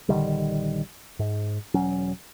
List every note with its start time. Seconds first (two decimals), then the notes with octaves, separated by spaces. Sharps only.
0.09 A#1 D3 D#3 G3
1.19 G#2
1.74 E1 F#3 C#4